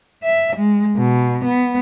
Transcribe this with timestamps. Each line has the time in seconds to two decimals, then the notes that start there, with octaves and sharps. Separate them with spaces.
0.23 E5
0.56 G#3
0.97 B2
1.44 B3